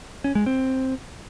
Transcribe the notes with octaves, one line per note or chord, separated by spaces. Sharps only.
C#4
G#3
C4